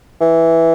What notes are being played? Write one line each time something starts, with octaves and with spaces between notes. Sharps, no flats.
E3